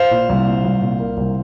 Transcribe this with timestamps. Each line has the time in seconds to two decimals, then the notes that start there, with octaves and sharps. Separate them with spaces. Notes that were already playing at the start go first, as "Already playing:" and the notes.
Already playing: C5 F5
0.11 A#2
0.29 C2
0.47 A#2
0.64 C2
0.81 A#2
1.00 A#3
1.17 C2